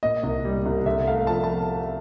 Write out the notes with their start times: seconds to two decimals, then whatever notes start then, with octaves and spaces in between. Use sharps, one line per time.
0.03 A#2 D#5
0.23 C2
0.45 G3
0.66 C2
0.86 D3 E5
1.07 A3 F5
1.27 F3 A5
1.44 A5